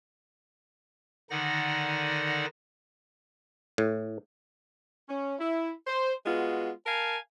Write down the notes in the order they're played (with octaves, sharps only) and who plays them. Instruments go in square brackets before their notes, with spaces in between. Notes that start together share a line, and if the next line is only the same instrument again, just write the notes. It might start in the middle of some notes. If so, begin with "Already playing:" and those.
[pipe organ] D3 D#3 D#4 D5 F#5 A#6
[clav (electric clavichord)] A2
[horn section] C#4
E4
C5
G#3 B3 F4 F#4
A#4 F5 G#5 A5